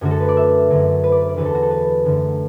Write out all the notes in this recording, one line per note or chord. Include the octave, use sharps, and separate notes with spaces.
F#2 D3 A3 F#4
A4
B4
D5
E5
F#2 D3 F#3
B4
D5
B4
D5
E2 D3 F#3 B4
A4
F#4
A4
B4
F#2 D3 A3